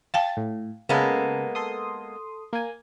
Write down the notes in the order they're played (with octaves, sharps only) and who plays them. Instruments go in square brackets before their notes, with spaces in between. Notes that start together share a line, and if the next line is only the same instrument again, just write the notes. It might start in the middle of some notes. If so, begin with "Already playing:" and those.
[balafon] F5 G5 A5 [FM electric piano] A6
[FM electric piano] A2
[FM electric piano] C#3 A4 [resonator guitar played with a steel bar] G#3 A#3 B3
[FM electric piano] A4 C6 D#6
A#3 G#5